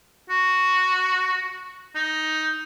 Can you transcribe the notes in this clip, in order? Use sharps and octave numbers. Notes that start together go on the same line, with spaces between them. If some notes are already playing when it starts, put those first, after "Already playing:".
F#4
D#4